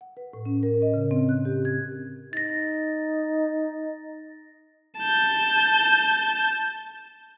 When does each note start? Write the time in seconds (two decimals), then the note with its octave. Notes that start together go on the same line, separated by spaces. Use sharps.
0.01 F#5
0.17 B4
0.33 A2
0.46 C#4
0.63 A#4
0.82 D#5
0.94 C#3
1.11 C4
1.29 F#6
1.45 G4
1.65 G#6
2.33 D#4 A6 A#6
4.99 A5 G6